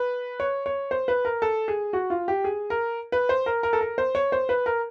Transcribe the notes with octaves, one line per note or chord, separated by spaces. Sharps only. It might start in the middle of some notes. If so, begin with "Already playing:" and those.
Already playing: B4
C#5
C#5
C5
B4
A#4
A4
G#4
F#4
F4
G4
G#4
A#4
B4
C5
A#4
A#4
A4
A#4
C5
C#5
C5
B4
A#4